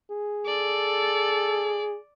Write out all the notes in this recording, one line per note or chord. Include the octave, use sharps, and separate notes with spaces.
G#4
A4 D5